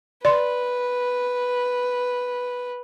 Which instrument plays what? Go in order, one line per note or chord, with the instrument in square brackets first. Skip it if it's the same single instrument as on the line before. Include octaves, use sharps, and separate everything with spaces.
[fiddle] B4 [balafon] D5 C6